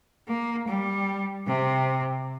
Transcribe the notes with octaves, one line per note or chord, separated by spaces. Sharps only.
A#3
G3
C3